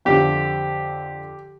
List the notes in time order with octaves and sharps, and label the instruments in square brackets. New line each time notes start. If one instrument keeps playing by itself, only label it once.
[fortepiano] F2 D3 F3 G4